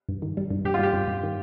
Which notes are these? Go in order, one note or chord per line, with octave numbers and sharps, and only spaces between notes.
G2
D#3
G3
G2
G2 G4
F4
G3 G4
G2
G2
D#3